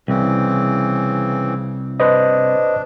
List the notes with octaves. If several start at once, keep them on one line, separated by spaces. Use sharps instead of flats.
C2 C#3 E3 C4
D4 B4 C5 D#5